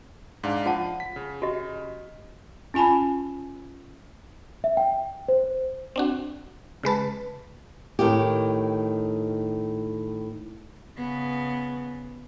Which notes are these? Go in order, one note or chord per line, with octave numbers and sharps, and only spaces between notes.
G#2 D4 F5
F3 F4 F#5 A5
B6
C#3
F#4 G4 D#5
C#4 F4 G#5 A5 B5
E5
G5
C5
C4 D4 F#4
C#3 G#3 B4 A5
A2 D#3 G4
C#3 B3